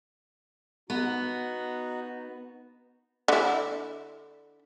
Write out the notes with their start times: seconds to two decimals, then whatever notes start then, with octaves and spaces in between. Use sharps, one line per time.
0.90 B3 D#4 F#4
3.28 D3 E4